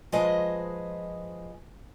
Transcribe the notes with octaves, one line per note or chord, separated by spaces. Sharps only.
F3 G#3 G#4 B4 C5 D#5